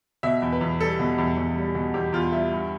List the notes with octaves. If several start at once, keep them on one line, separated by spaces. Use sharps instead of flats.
B2 E5
E2
B4
E2
G3 A4
B2
E2
E2
G3
B2
E2 G4
E2 F4
G3 E4
G2